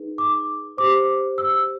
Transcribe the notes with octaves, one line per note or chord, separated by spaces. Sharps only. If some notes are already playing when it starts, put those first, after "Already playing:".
Already playing: D#4 G#4 B4
D6
G4 C5 D6
E6